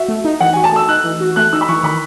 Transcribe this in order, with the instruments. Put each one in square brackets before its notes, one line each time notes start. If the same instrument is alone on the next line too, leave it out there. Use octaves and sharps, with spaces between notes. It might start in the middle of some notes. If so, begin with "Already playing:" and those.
Already playing: [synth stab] F#4 [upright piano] E5
[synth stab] A3
D#4
[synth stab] E3 [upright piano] F#5
[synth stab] F#4 [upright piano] G#5
[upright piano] A5
[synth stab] A3 [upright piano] E6
[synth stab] D#4 [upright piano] F#6
[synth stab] E3
F#4
[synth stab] A3 [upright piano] F#6
[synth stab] D#4 [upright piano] E6
[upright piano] B5
[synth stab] E3 [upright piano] C#6
[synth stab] D#3 [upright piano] B5